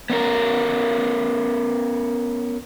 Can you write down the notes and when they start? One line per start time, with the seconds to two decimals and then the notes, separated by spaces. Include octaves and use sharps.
0.10 B3 C#4 A#4